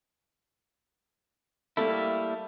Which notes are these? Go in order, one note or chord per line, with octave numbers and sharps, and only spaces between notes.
G3 A3 A#3 E4